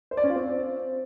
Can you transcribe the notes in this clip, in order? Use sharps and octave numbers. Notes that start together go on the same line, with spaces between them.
C5
D5
C#4
F4
C4